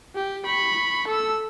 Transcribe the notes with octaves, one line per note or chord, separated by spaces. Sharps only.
G4
B5 C#6
A4 E6